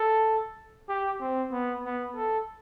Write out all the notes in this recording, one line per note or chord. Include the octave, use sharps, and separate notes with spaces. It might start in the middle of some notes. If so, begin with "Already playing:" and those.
Already playing: A4
G4
C4
B3
B3
A4